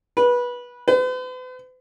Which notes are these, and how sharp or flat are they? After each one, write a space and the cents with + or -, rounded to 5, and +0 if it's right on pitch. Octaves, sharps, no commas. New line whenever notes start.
B4 -20
B4 +45